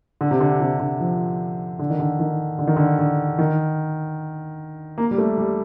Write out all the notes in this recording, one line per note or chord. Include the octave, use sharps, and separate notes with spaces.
D3
C3
D3
C3
D3
F3
D3
D#3
D3
D#3
D3
D#3
D3
D3
D#3
A#3
G3
A3
G3